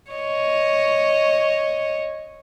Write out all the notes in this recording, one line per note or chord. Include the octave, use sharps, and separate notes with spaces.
C#5 D#5